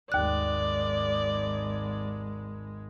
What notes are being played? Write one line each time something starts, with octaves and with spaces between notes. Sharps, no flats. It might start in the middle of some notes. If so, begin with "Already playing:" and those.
G#1 D#2 G#3 D5 F#6